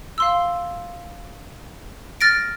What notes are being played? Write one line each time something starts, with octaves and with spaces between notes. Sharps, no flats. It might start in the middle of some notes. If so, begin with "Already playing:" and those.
F5 C6 E6
F6 A6 A#6 D7